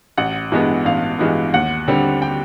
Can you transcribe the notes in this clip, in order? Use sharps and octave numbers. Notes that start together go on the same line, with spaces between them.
A1 F#5
G2 E3 G#3 B3
A1 F5
G2 E3 G#3 B3
D#2 F#5
D3 G3 C4
G5